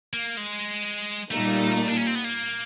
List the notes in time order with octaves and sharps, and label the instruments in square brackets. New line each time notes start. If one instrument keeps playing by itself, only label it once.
[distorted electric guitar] A#3
G#3
[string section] A#2 G3 A#3 D#4 [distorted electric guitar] A3
[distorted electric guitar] D4
C#4
C4
B3
A#3